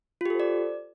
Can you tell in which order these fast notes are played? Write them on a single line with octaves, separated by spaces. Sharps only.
F4 G4 A4 C5 D5